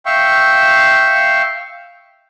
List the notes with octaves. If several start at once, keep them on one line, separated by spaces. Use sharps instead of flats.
E5 F5 G5 C#6